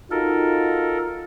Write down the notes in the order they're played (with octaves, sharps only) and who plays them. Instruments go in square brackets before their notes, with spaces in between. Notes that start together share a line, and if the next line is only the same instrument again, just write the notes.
[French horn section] D#4 F4 F#4 [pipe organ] A4 A#4